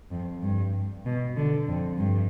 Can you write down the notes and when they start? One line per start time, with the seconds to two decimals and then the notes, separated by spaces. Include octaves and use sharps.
0.11 F2
0.42 G2
1.05 B2
1.36 D3
1.68 F2
1.98 G2